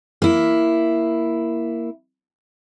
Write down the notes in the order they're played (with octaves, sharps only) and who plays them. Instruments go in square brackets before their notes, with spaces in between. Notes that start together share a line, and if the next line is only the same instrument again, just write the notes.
[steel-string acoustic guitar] A#3 E4